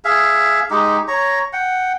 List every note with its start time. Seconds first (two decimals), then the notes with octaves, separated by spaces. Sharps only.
0.05 G#4 E5 F5
0.70 G#3 D#4 G4
1.08 C#5 A#5
1.53 F#5 G5